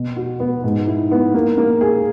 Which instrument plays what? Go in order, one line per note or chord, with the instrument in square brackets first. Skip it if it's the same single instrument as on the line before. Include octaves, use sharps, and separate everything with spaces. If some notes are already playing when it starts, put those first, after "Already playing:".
Already playing: [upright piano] B2
F#4
B3
G#2
E4
B3
A#3
A#3
G#4